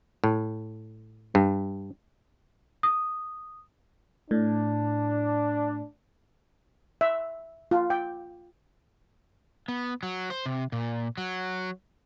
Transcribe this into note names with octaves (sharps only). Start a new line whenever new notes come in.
A2
G2
D#6
A2 D4
E5
F4
G5
B3
F#3
C5
C3
A#2
F#3